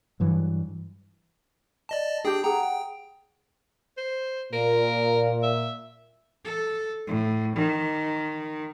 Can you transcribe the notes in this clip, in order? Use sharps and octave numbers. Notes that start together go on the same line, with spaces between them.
G2 E3 F#3
D5 D#5 A5
D4 G4 G#4 G5
G#4 F#5 G5 A#5
G5
C5
A#2 A#4
E5
A4
A2
D#3